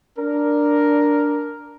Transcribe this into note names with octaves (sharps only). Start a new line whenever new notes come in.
D4 A#4